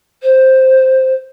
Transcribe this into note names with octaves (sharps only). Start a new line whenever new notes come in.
C5